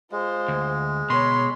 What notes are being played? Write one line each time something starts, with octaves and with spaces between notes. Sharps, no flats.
G#3 F4 C5
D2
B2 C#5 B5 C6